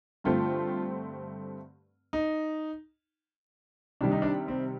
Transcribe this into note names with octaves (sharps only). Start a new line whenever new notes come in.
G2 D3 A3 C4 F4
D#4
C3 D#3 G3 D4
D#4
D4
C4